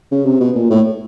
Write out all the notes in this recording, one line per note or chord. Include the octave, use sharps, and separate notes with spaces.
C#3
C3
B2
A#2
A2